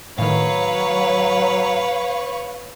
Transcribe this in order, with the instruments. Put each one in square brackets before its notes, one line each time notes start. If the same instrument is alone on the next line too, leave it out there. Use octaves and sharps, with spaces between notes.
[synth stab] A2 D#3 [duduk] F#3 [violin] B4 C#5 [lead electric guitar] F5